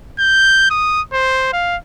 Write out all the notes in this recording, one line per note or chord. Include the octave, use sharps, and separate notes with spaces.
G6
D#6
C5
F5